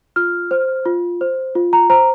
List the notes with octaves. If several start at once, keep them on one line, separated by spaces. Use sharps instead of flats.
F4 F6
C5
F4
C5
F4
A#5
C5 A#5